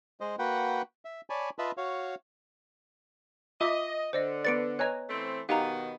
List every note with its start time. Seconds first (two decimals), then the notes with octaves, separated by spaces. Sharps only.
0.20 G#3 C5 D#5
0.39 A#3 F#4 B4 F#5 G5
1.05 E5
1.30 C#5 D5 G#5 A5 B5
1.59 F4 B4 D#5 E5 A5 B5
1.77 F#4 C#5 F5
3.61 F4 D#5 E5 D6
4.13 D3 C5 D5 D#5
4.45 B3 B4 D5 A6 C#7 D7
4.79 B4 C#5 D#5 G#5 A#5 F#6
5.10 E3 A3 C4
5.49 B2 D#3 B3 D#4 G4 F5 A#5